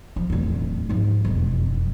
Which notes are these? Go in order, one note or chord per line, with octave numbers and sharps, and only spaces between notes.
F3
D1 E2
G#2 F3
E1 F2